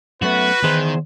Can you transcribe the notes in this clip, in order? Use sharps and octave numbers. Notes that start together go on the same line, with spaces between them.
F#2 A3 B3 F#4 B4
E2 D#3 G#4 C5